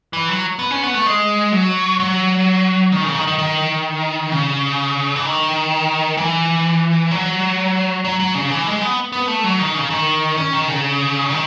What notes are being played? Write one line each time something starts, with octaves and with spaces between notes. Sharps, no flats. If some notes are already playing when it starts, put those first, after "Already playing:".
E3
F#3
B3
C#4
B3
A3
G#3
F#3
F#3
D#3
C#3
D#3
D#3
D#3
C#3
E3
D#3
E3
F#3
F#3
F#3
C#3
E3
G#3
B3
B3
A3
F#3
D#3
C#3
D#3
C#4
D#3
C#3
D#3